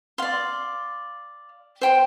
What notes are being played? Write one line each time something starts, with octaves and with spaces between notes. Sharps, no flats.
D5 F5 C6
C5 G5 C6